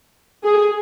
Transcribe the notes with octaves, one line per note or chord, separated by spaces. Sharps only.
G#4